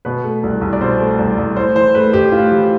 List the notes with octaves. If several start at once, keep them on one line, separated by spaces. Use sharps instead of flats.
B2 B4
A3
C2
C2
D5
B2 C5
A3
C2
C2
A2 C5
E3 C5
A3 B4
A1 G4
A2 F4
E3 G4